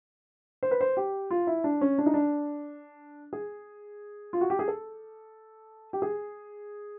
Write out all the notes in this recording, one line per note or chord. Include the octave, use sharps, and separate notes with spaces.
C5
B4
C5
G4
F4
E4
D4
C#4
D4
D#4
D4
G#4
F4
F#4
G4
G#4
A4
G4
G#4